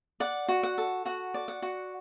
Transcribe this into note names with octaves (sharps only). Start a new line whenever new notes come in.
D5 F#5
F#4
F#5
A4
F#4 F#5
D5
F#5
F#4